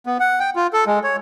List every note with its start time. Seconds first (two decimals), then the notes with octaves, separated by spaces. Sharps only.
0.06 B3
0.20 F#5
0.40 G5
0.56 F4
0.73 A4
0.87 G#3
1.04 C#5